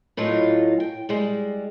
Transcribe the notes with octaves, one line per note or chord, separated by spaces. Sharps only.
A2 F#3 D#4 F4
G5
G3 G#3